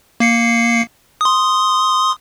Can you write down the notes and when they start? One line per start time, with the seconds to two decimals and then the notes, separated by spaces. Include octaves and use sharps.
0.20 A#3 C7 C#7
1.21 C6 D#6